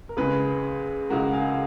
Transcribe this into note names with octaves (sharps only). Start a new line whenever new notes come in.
A#4
C#2 C#3 G#3 G#4 B4
C#2 C#3 G#3 F#4 A#4
F5 G#5